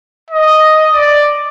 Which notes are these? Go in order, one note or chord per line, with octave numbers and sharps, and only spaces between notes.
D#5
D5